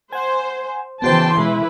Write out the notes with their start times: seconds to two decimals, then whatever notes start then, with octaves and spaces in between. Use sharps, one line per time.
0.13 C5 F#5 G#5
1.02 C#3 E3 B3 F#4 C5 G5 A5 C6
1.37 B2 G#3 E4 B4